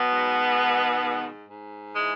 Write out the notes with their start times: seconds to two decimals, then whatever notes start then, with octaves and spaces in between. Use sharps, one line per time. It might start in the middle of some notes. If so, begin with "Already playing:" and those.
Already playing: B2 F#3 B3
0.10 G#2
0.56 D#3
1.02 G#2
1.48 G#2
1.94 E3 G#3